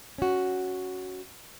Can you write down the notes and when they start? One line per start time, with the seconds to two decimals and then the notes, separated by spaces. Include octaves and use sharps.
0.18 C#4 F#4